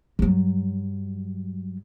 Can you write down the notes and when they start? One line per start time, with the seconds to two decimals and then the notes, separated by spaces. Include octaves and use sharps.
0.19 G2 F#3